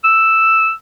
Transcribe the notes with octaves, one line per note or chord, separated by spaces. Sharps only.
E6